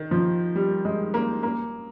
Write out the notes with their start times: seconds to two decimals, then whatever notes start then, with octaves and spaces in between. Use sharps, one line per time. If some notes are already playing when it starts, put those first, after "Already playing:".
Already playing: D#3
0.11 F3
0.55 G3
0.85 G#3
1.14 A#3
1.43 A#3